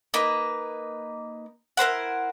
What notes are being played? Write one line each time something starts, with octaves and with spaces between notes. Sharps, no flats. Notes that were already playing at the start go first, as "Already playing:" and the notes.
A#3 D#4 B4
E4 A#4 C5 F#5